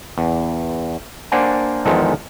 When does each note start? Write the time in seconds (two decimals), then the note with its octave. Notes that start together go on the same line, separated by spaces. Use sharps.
0.18 E2
1.32 A#3 D4 C5 D5 F#5 G#5
1.85 E2 D#3 F3 G#3 A4